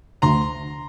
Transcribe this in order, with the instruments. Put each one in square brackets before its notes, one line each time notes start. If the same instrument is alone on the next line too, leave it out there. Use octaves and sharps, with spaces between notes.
[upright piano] D2 [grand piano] A#5 C6